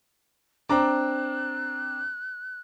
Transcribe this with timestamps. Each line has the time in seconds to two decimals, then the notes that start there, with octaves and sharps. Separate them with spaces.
0.69 C4 D4 A#5 D6 F#6